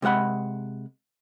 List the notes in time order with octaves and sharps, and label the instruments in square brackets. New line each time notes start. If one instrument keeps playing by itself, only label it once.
[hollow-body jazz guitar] C3 G#3 A4 F#5 B5